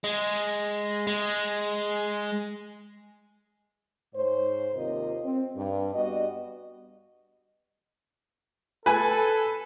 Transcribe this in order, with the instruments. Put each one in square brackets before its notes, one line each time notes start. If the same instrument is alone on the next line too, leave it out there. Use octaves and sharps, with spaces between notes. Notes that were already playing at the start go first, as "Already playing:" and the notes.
[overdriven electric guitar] G#3
G#3
[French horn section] G#2 C5 C#5
D#2 C3 F4 A#4 D#5
C4
G2
G3 B3 F#4 D#5
[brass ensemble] A4 [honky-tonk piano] B4 G#5